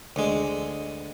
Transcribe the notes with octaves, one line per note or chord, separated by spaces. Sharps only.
D2 G#3